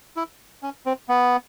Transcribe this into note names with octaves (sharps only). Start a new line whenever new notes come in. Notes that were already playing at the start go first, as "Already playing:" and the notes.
E4
C#4
C4
B3